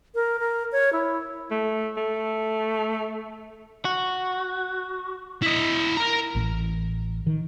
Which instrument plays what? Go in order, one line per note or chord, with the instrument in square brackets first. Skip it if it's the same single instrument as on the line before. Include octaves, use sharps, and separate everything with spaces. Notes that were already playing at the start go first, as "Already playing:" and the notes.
[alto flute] A#4
A#4
C#5
E4
[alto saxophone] A3
A3
[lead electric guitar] F#4
[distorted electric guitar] E4 D#5
A#4 A#5
[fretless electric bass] A1
D#3